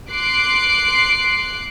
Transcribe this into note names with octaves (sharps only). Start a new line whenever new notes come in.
C6 D6 F#6 C7 D7